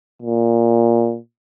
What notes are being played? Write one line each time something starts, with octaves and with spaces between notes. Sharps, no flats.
A#2